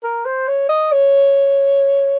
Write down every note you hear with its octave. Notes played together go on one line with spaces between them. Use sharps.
A#4
C5
C#5
D#5
C#5